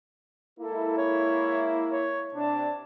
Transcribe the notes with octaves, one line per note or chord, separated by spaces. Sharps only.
G#3 A#3 E4 A4
C#5
C#5
C3 D4 A5